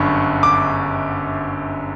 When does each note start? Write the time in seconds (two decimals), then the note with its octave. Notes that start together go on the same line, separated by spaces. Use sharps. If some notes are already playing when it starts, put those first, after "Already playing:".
Already playing: G1 F#2 D3 B5 C#6
0.43 D6